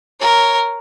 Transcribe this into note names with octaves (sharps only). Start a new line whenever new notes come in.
A#4 C#5